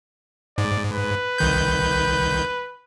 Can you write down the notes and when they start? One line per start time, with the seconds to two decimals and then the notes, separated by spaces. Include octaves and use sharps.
0.58 G#2 D5
0.92 B4
1.38 C2 D#3 G6